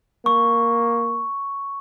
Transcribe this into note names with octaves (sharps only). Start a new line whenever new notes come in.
A#3 C#6